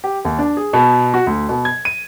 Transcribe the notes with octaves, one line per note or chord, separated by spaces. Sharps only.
G4
D#2
D4
G#4
B2
F#4
D2
B2
G#6
D#7